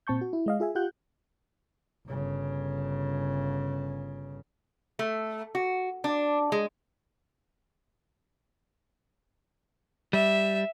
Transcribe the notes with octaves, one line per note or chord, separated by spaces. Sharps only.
A#2 C4 A5 C#6 G6
F#4
E4
G#3 D#5 F5
F4 G#4 E5 G#5
F4 G4 F#5 F#6 G6
G1 C#3
A3
F#4
D4
G#3
G3 E5